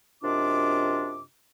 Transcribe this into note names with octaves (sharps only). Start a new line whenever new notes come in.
F#2 C3 D4 F4 D#5 D6